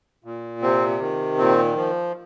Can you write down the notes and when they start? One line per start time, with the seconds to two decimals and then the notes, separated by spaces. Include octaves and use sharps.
0.24 A#2
0.62 C3 C4
1.00 D#3
1.38 A#2 C4
1.76 F3